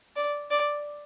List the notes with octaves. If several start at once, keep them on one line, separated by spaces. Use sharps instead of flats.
D5
D5